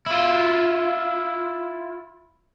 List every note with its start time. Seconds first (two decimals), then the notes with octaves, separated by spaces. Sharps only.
0.07 E4 F4